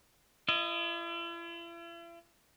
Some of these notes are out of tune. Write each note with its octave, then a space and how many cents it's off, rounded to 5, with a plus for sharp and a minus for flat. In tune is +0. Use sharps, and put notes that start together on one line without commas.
E4 +45 D#5 +0